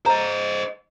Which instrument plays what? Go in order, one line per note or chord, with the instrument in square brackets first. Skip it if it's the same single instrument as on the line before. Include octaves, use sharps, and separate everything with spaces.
[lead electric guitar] C5 D#5 [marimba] A#5